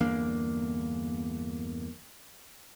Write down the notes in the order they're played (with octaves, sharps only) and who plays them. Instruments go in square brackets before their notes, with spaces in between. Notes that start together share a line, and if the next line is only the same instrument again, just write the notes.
[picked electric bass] G1 E2 A#3 D4